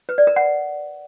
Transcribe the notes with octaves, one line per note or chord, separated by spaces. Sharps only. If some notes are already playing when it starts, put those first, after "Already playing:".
B4
D5
A#4
F#5